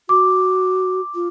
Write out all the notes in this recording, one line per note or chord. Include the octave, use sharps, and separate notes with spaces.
F#4 D6
F4